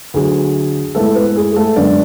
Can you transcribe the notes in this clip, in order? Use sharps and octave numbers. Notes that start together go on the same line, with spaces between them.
D2 D3 F#3 G#4
A2 G#3 A3 B3 A4
B3 B4
G#4
G#4
A3 A4
F#2 D3 G#3 B3 D4 D5